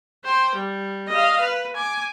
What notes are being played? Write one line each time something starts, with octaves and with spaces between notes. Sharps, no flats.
C5 G5
G3
D#5 F5
B4
G#5 D6